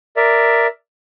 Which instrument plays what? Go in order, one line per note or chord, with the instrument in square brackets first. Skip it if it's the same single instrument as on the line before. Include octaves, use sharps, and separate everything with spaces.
[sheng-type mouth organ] A#4 D5 E5